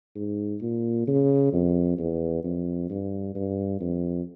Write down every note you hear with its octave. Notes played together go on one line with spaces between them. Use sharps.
G#2
A#2
C#3
F2
E2
F2
G2
G2
F2